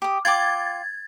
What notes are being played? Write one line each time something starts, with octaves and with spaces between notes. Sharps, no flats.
G4 D#6
F4 G5 D6 G#6 A6